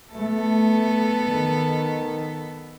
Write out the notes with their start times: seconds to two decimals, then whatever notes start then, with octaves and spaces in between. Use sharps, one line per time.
0.13 A3 B3 A4
1.26 D#3